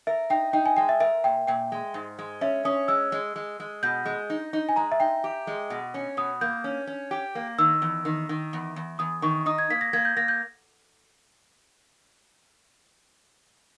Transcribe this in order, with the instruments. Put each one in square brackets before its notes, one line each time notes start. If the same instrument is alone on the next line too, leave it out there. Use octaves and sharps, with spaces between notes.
[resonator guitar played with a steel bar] A#4 [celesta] E5
[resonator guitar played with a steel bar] D#4 [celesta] G5
[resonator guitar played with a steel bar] D#4 [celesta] G5
[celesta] G#5
[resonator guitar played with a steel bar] G#3 [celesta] G5
[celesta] E5
[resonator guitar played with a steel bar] A#4 [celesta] E5
[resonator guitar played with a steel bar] A#2 [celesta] G5
[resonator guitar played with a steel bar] A#2 [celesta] G5
[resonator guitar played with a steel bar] G#3
G#2
G#3
[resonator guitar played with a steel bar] C#4 [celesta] E5
[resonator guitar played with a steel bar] C#4 [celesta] D#6
[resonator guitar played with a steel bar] G#3 [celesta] E6
[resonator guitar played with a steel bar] G#3
G#3
G#3
[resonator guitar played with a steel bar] B2 [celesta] G6
[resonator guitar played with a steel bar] G#3
D#4
D#4
[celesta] G#5
[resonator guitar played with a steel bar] G#3 [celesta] A#5
[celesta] E5
[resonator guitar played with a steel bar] D#4 [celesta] G5
[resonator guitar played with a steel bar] G4
G#3
B2
C#4
[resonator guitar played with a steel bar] B2 [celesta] D#6
[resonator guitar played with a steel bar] A#3 [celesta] G6
[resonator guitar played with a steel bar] C#4
C#4
G4
A#3
[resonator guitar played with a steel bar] D#3 [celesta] E6
[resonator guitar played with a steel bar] E2
D#3
D#3
E2
E2
[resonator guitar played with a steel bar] E2 [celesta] D#6
[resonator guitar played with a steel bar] D#3 [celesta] C#6
[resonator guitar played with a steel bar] D#4 [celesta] D#6
[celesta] G#6
[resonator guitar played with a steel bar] A#3 [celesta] B6
[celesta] A#6
[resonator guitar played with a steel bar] A#3 [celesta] G#6
[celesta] G6
[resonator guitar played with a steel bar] A#3 [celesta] A#6
[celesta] G6